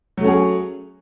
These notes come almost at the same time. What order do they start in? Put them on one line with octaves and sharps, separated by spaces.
F#3 A3 C#4 G#4